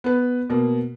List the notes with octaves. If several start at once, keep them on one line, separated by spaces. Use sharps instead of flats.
B3 B4
B2 A#3